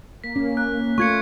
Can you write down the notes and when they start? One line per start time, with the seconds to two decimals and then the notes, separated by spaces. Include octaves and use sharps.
0.24 A#3 B6
0.36 C#4
0.57 F#6
0.98 A3 F4 C#6 G#6 C#7